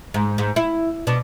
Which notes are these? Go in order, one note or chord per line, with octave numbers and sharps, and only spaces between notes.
G#2
G#2
E4
B2 D4